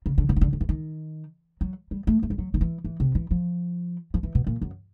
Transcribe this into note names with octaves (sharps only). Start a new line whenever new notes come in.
C#3
D3
C#3
D#3
D3
D#3
E3
D#3
F#3
G3
A3
A3
G3
F#3
D#3
E3
E3
C3
E3
F3
F3
E3
B2
A#2
F#2